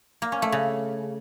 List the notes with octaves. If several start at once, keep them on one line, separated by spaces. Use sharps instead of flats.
A#3
C#4
A3
C#3